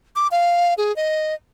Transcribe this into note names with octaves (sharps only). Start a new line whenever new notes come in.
D6
F5
G#4
D#5